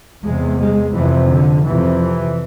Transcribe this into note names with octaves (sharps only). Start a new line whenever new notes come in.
E2 C3 G#3
G#3
F2 C3 E3
D3
F2 C3 E3